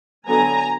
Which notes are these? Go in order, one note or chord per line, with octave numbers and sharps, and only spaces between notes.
D3 F#3 B3 G#5 A#5